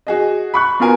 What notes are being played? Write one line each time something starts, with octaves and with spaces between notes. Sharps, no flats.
F#4 G#4 D#5
B5 C#6 F#6
B3 F4 F#4 A#4 G#5